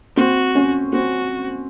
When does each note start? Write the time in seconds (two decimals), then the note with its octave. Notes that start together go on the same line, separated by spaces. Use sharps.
0.17 C4 F#4
0.55 C#4
0.93 C4 F#4